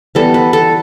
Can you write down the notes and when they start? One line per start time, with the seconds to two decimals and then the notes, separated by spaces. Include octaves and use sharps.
0.15 E3 G3 B3 A4
0.34 B4
0.53 A4